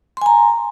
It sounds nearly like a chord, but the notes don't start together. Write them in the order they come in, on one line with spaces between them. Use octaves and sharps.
C6 G#5 A#5